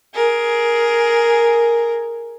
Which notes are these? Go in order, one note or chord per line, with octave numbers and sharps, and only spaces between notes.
G#4 A#4